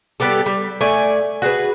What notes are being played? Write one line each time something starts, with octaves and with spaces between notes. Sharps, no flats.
G3 B3 G4 A4
G3
A3 D5 G#5
F#4 G#4 B4